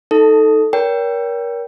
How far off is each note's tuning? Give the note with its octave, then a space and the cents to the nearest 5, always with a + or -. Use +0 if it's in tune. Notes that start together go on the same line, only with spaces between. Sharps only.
D#4 +15 A4 +0
A#4 +25 C#5 +35 G5 +0